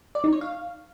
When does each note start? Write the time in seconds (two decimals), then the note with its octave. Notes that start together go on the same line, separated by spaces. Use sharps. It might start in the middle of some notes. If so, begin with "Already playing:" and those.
0.15 D5
0.24 D#4
0.33 C#5
0.41 F5